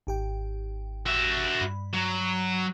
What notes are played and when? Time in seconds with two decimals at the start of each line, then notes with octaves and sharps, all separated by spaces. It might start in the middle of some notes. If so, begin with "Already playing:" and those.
0.07 G#1 G4 G5
1.06 F#4 E5
1.61 G2 B5
1.94 F#3